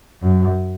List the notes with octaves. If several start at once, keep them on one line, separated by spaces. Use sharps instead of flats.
F#2